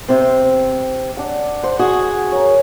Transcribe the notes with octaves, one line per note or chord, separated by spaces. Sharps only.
C3 C4
D4 F#5
C5 F#5
F#4 G#4
A#4 C#5